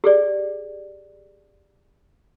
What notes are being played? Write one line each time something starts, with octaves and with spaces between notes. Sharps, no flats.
G4 G#4 D5